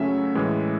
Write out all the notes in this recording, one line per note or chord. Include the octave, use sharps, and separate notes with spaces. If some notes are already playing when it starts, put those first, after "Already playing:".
Already playing: C#3 F#3 A3 C#4 E5
A2 E3 G#3